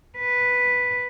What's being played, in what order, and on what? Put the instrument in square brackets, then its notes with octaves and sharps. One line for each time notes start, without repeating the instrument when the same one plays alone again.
[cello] B4